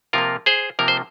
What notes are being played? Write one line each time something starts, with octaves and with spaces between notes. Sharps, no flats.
C3 F3 A#3 F4 A#4
G#4 C5
C3 F3 A#3 A#4
C5